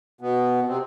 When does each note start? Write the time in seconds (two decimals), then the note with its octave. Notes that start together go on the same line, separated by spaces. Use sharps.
0.21 B2 B3
0.67 C3 C4